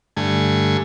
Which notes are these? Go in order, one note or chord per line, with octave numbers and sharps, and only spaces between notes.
G2 D3 A3 G#5